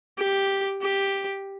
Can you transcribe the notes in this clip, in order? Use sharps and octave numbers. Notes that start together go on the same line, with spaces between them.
G4
G4